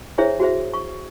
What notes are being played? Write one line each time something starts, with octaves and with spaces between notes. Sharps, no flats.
D4 E4 G#4 C5 C#5 E5
F#4 G#4 C5 E5
C#6